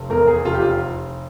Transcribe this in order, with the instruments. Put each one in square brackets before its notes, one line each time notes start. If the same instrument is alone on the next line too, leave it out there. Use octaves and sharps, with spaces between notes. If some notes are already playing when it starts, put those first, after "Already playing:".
Already playing: [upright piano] F1
E2 A#4
G#4
F1 F4
G4
F4